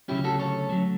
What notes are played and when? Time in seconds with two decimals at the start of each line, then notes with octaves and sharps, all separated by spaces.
0.08 D2 C#3 F#3 C#4 E4 G4
0.24 F#4 A4
0.39 A4 C#5
0.69 F#3 A3